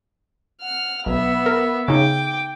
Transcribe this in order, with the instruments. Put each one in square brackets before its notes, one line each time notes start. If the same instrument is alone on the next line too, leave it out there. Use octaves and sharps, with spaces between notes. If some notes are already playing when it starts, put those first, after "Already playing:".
[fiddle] F#5 F6
[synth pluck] B1 [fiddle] B3 E5
[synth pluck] A#4
[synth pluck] C#3 D#4 [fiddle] G5 D6